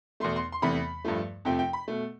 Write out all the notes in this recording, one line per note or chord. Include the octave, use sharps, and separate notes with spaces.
E2 B2 A3 C6
C6
C6
E2 C3 E3 A3 B5
G2 F3 A3
F2 C3 F3 A3 G5
G5
B5
B2 A3